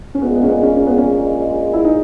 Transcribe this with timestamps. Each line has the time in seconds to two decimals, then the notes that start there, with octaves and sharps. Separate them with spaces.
0.15 C#4
0.21 A#1 A#2 G#3 B3
0.35 B3
0.43 C#4
0.49 B3
0.63 C#4
0.76 C#4
0.87 B3
0.98 C#4
1.73 E4
1.85 D#4